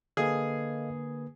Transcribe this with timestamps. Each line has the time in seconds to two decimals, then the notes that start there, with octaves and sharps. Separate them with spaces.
0.17 D3 A#3 G#4 A4 B4 D#5 F5